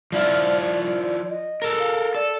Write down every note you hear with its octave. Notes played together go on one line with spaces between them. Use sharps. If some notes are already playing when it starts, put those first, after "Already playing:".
F3 E4 F4 D5
D#5
A4 A#4
F5
A4 D5